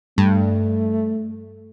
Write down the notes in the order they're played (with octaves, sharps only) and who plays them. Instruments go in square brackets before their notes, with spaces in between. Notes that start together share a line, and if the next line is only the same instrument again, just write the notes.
[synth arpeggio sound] G2 [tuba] A3